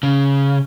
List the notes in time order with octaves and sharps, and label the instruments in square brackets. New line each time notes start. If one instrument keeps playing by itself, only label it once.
[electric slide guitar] C#3